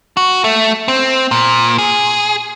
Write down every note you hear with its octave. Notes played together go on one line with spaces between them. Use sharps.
F#4
A3
C4
A#2
G#4